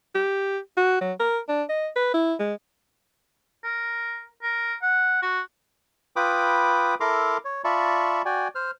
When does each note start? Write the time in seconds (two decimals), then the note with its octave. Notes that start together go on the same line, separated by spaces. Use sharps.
0.15 G4
0.77 F#4
1.01 F#3
1.20 A#4
1.49 D4
1.69 D#5
1.96 B4
2.14 E4
2.39 G#3
3.64 A#4
4.43 A#4
4.82 F#5
5.22 F#4
6.16 F4 B4 G5 B5 D6 D#6
7.00 E4 A4 A#4 A#5 C6 D6
7.45 C#5
7.64 F4 D5 E5 A5 B5 C#6
8.25 F#4 D5 G5 G#5
8.55 C5 F6